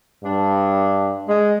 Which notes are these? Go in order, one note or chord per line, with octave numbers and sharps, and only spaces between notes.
G2 D4
G#3